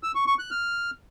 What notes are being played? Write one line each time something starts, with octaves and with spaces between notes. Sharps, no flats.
E6
C#6
C#6
F#6
F6